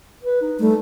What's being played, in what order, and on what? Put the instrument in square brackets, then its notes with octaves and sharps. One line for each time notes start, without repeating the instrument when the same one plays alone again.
[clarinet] B4
D#4
[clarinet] G3 [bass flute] A3